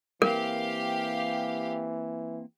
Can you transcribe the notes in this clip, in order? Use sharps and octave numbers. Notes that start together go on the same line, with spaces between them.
E3 A#3 C4 G4 A#4 F5